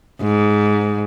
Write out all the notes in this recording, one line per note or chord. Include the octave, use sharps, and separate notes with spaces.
G#2